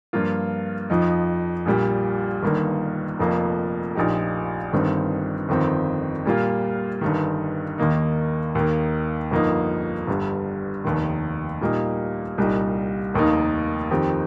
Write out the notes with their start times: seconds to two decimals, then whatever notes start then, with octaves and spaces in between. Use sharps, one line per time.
0.13 G2 F3 A#3 F4
0.90 F2 F3 D#4
1.66 A#1 A#2 G3
2.43 G1 G2 D#3 A#3
3.19 F1 F2 F3 A#3
3.95 A#1 A#2 F3 D#4 G4
4.73 G1 G2 D#3 C4
5.49 G1 F2 D#3 C4
6.25 A#2 G3 A#3 F4
7.01 G1 G2 D#3
7.78 D#2 D#3 A#3 D#4
8.55 D#2 D#3 A#3
9.31 G1 F2 F3 A#3 D#4
10.07 G1 G2 G3
10.85 F1 D#2 D#3
11.61 A#2 G3 A#3 D#4
12.38 C2 A#2 G3 D#4
13.14 F1 D#2 D#3 A#3 D#4
13.91 F2 D#3 C4 G4